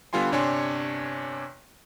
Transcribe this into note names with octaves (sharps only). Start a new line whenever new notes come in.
D3 G3 B3 F4 G#5 C6
G1 C3 D4 C#5 G#5 C6